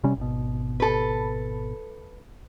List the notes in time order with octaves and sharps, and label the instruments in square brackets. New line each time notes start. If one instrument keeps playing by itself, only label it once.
[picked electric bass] C3 G3 C#4
G#1 B2
[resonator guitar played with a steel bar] A4 B4